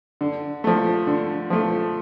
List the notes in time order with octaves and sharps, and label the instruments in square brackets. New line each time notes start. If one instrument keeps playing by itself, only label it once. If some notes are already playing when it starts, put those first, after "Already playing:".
[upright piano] D3
F3 A3
D3
F3 A3